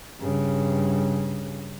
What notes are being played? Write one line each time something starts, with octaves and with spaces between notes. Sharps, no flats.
G2 C#3